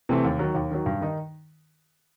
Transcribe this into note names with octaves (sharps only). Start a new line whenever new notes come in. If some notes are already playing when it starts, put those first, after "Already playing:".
C3 E3 A3 C4
D#2
D#3 F#3
D#2
D#3 F#3
G2
D#3 D#4